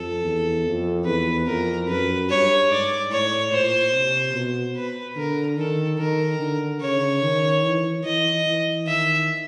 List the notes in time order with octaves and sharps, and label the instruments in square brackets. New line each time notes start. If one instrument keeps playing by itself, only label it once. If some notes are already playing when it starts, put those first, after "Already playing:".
Already playing: [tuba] F2 [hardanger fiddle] A4
[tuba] E2
F2
[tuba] E2 [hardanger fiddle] B4
[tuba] F2 [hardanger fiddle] A#4
[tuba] F#2 [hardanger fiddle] B4
[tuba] G2 [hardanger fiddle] C#5
[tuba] G#2 [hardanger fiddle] D5
[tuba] A2 [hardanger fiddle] C#5
[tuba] A#2 [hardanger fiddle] C5
[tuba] C3
B2
[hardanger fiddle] B4
[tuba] D3 [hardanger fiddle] A#4
[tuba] D#3 [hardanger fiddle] A4
[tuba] D#3 [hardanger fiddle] A#4
[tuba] D3
[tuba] C#3 [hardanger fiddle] C#5
[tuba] D#3
E3
[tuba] E3 [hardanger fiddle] D#5
[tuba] E3
[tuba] D#3 [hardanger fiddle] E5